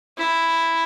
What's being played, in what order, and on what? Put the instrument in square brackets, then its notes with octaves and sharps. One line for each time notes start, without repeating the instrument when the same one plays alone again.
[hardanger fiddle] E4